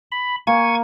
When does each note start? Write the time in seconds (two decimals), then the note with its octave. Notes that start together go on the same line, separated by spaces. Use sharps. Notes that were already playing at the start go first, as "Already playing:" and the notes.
0.12 B5
0.47 A#3 G#5 C#6 G#6